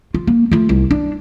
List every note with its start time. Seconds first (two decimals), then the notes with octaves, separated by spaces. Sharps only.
0.14 F4
0.27 A#3
0.52 A3 F4
0.69 C2
0.91 D4